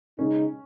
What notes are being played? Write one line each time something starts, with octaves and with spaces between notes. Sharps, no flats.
C#3 G#3 C#4 D#4